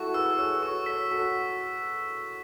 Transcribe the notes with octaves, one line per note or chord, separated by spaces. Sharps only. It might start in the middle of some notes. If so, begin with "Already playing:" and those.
Already playing: E4 F#4 A4 C#6
G#4 B4 E6
A4 C#5 E6
F#4 A4 C#6
A4 C#5 B6
F#4 A4 B6